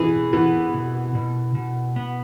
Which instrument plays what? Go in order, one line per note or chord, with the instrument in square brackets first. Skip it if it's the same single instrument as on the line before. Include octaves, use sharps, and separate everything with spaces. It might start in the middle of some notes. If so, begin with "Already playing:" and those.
Already playing: [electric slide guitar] B2 G#4 [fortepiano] E3
[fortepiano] E3 [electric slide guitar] B3
[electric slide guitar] B2
B2
B2
B3